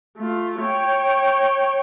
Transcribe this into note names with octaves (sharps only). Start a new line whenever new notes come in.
A3 F4
C#5 G5